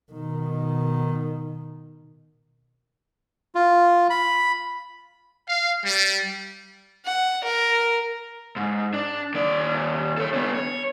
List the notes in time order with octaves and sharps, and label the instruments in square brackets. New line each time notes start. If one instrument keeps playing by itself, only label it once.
[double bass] B2 D#3
[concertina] F4
B5
[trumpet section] F5
G3
[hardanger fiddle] F#5
A#4
[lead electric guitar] G#2
D4
D#2 D5
A4 C#5
B3 D4
C#5